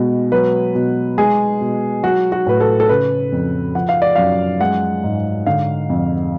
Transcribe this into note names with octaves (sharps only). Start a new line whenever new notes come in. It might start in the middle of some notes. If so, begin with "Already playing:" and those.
Already playing: B2 G#3
F#3 B4
B2
G#3 G#4
B2
F#3 F#4
F#4
A2 B4
A4
A4
C#3 B4
F2
F3 F#5
F5
D5
F#2 F5
G#3 F#5
G#2
D3 F5
F2